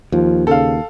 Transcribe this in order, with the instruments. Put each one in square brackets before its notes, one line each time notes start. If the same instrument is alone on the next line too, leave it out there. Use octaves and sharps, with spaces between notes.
[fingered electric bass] D#2 [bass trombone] F3
[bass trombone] C#3 [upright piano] A4 F5